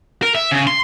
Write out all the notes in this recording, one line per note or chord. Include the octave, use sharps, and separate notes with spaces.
A#4
E5
C#3
C6